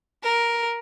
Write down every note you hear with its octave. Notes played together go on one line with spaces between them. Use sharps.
A#4